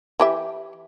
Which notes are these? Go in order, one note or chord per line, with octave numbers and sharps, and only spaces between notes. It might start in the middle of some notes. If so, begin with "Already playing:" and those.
E3 G4 E5